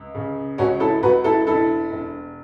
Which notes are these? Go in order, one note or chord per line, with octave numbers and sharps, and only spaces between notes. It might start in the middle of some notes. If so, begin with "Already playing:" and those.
Already playing: C#2
C#3
C#2 C#4 F#4
E4 A4
C#2 F#4 B4
E4 A4
E1 E4 A4
E1